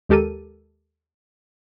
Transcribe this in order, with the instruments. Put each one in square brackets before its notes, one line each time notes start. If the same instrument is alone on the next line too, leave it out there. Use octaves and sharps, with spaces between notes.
[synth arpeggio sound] D#2 G#3 G4 A4 A#4 D#7